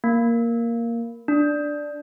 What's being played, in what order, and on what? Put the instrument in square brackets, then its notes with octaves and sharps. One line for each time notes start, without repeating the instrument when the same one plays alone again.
[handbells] A#3
D4